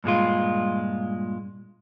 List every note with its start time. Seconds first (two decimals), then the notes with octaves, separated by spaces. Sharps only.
0.04 G2 A#2 G#3 F4